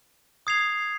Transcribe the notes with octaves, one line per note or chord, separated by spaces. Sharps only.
D#6 G#6 C7 F7